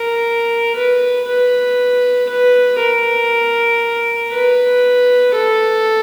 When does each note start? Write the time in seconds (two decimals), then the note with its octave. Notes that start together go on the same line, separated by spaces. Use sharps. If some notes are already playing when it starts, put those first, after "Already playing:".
Already playing: A#4
0.76 B4
1.27 B4
2.29 B4
2.79 A#4
4.32 B4
5.34 A4